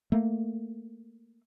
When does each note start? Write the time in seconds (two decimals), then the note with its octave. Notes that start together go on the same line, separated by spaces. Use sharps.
0.12 A3 A#3